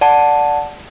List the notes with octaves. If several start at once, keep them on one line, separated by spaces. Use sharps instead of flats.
D5 F#5 A5